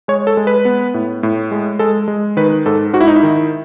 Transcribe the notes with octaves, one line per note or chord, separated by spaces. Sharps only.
G#3 C#5
A4
G#3
B4
B3
A2
A2
G#3
G#3 A4
G#3
D#3 B4
G#2 A4
G#2 F#4
E4
D#4
E4
D#3